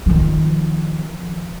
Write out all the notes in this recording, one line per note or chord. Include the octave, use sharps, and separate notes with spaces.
D#3 F3